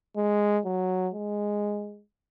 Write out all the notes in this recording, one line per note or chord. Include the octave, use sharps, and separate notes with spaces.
G#3
F#3
G#3